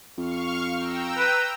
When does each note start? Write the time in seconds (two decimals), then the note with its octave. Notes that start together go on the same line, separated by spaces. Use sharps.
0.18 F2 F5 C#6 F6
0.76 G5 A#5 E6
1.18 B4